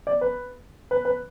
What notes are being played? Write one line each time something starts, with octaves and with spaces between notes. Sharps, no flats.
D5
B4
B4
B4